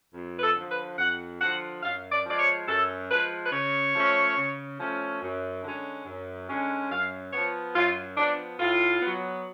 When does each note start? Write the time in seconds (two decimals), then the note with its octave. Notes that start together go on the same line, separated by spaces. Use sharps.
0.14 F2
0.38 B4
0.42 A4
0.56 D3 F3
0.70 B4
0.98 F2 F#5
1.41 D3 F3 F#5
1.83 F#2 F5
2.11 D5
2.26 F3 G#3 D5
2.40 C#5
2.68 F#2 A4
3.10 F3 G#3 B4
3.45 B4
3.52 C#3 C#5
3.94 F3 A3 C#4
4.37 C#3
4.79 F3 A3 C#4
5.21 F#2
5.64 D3 G#3 C#4
6.06 F#2
6.48 D3 G#3 C#4
6.90 F#2 F5
7.32 F3 B3 C#5
7.75 F#2 F4
8.17 F3 B3 D4
8.59 A2 F4
9.01 F#3 B3